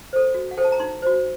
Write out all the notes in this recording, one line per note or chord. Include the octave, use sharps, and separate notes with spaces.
A4 C5
F#4
F#5
A4 C5 G5
A5
A#5
D#4 C6
F#4 C5